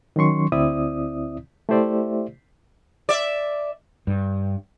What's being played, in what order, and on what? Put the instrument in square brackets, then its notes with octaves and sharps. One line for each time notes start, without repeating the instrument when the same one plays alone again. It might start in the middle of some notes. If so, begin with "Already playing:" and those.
[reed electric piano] D#3 F#3 C#4 C6 C#6
D2 C4 E4 D5 E5 D#6
A3 E4 G4 C5 D5 E5
[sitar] D5 E5
[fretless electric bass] G2